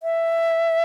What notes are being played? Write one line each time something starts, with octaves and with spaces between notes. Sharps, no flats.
E5